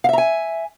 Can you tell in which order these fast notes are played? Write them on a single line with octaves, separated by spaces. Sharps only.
F5 E5 A#5 G#5